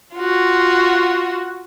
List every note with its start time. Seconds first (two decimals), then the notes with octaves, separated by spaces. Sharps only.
0.16 F4 F#4